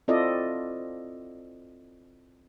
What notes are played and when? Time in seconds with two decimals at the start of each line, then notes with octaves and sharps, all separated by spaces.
0.08 C4 E4 F4 A4 D5 D#5